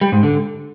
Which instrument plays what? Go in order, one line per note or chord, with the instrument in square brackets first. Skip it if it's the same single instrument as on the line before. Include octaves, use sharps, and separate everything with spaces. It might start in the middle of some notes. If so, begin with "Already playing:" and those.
[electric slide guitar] G3
G#2
D3